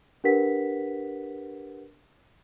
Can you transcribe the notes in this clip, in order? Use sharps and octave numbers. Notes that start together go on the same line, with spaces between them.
D4 G4 A#4 B4 F#5 B6